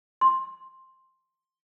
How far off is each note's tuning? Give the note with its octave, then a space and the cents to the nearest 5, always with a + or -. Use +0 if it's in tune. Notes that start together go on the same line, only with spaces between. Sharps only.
C6 +5